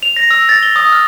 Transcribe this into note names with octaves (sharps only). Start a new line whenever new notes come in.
F7
A#6
E6
A6
G7
D#6
F6